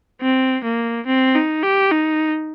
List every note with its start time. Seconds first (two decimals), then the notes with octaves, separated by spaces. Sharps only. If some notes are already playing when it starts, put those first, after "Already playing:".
0.22 C4
0.64 A#3
1.06 C4
1.35 D#4
1.63 G4
1.92 D#4